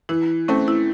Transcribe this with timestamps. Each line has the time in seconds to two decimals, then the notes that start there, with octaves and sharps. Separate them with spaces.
0.09 E3 E4
0.48 A3 C4 C#4
0.68 E4